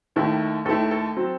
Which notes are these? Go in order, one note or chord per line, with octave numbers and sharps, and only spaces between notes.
D#2 D#3 A3 E4
D#2 D#3 A3 E4 A4
A4
F#3 C4